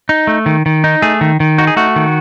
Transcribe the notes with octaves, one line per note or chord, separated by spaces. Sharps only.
D#4
A3
D#3
D#3
D#4
A3 G#4
D#3
D#3
D#4 F#4
G#4
A3 F#4
D#3